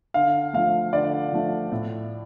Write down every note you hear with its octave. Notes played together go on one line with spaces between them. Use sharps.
D3 F5
F3 A3 F5
D3 D5
F3 A3
A2